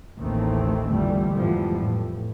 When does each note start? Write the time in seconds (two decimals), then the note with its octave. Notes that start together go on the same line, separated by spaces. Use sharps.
0.19 A1 D#2 D#3 E3 A3 C4
0.92 A#1 F2 D3 E3 G3 A3
1.36 F2 G#2 E3 F3 G3 B3
1.80 A2